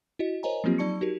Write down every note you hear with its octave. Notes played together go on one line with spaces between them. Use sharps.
E4 F#4 D#5
A#4 C5 C#5 D#5 G#5 A#5
F3 F#3 A#3 C4 F4 G4
F#3 D#4 D5 A5 C#6 C#7
D#4 F#4 G4 A#4